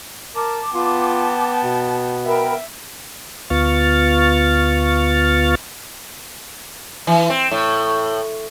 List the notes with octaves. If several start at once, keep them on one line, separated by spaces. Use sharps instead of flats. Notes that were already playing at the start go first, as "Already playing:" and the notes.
A#4 A5 D6
B3 F4 G5 A5
B2
A#4 E5 G5 B5
D2 B3 F4 C#6 F6 A6
E3
C4
A2